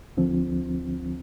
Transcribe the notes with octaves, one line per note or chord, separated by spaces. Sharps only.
D2 D3 F3 C4